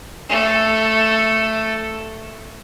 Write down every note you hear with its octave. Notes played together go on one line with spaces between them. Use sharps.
A3 A4